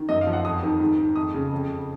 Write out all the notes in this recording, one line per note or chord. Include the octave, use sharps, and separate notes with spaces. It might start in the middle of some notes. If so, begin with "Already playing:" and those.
Already playing: D#3
F#2 D#5
F5
F3
F#5
F2 D#6
D#3
G#2
D#3
F2 D#6
C#3
F2
C#3